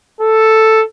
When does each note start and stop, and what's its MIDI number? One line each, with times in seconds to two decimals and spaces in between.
0.21 0.83 69